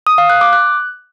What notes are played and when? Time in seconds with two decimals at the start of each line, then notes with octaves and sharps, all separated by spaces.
0.07 D#6
0.18 F5
0.30 F#6
0.41 D6
0.53 F#6